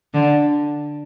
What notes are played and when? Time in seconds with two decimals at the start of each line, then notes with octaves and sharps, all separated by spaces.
0.14 D3